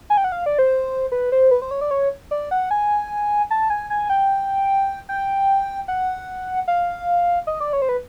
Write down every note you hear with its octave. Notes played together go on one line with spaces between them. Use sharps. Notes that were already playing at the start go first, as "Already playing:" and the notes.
G#5
G5
F#5
F5
D5
C5
B4
C5
B4
C5
C#5
D5
C#5
D5
F#5
G#5
A5
G#5
G#5
G5
G5
F#5
F5
D#5
D5
C#5
C5
B4